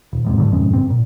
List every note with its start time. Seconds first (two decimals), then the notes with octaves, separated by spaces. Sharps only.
0.13 D#1
0.25 E2 G#2 C3
0.38 G#2 D3 F3 F#3
0.52 E1 F2 G#2 C#4
0.74 G1 C3 C4
0.90 A#2